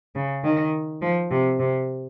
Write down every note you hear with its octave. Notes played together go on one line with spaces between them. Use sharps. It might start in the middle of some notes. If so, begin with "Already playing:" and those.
C#3
D#3
F3
C3
C3